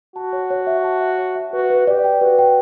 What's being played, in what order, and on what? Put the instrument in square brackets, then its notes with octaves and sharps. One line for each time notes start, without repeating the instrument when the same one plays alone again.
[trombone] F#4 [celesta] A5
[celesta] C#5
C#5
E5
A5
E5
C#5
E5
[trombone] F#4 [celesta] B4
[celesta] B4
[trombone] G4 [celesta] D5
[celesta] G5
[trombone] F#4 [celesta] B4
[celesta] G5